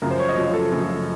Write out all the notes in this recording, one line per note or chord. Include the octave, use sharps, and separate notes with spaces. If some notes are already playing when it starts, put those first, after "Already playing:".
F#2 C#3 F3 A#4
C5
C#5
D#5
F#2 C#3 F3
A4
F#2 C#3 F3